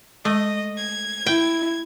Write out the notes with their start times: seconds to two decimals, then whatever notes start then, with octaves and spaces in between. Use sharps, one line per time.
0.25 G#3 A3 D#5
0.76 G#6
1.26 E4 G5